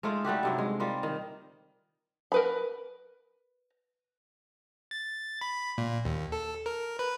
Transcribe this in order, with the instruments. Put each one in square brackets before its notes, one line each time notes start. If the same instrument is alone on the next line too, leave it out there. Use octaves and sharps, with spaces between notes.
[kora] G#3 A3 D#4 F4
G3 A3 F#4 G4
G2 C3 F#3
G#3
G3 F4 A#4
D#3
[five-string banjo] A#4 B4 B5
[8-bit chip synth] A6
B5
A#2
D#2
A4
A#4
B4